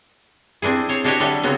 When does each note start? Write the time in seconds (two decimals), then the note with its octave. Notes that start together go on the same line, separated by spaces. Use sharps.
0.62 C4 D4 E4 G#4
0.89 C5 C#5
1.04 D4 F#4 G4 B4 C#5 D#5
1.20 D3 F#3 G3 A4 E5
1.43 C#3 F#3 B3 C4